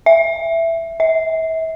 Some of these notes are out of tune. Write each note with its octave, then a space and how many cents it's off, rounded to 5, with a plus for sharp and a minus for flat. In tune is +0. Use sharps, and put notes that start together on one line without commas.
E5 +10
E5 -35